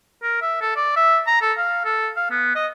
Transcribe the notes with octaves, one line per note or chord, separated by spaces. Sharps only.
A#4
E5
A4
D5
E5
A#5
A4
F5
A4
F5
B3
D#5